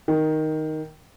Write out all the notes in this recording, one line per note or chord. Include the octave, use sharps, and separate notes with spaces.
D#3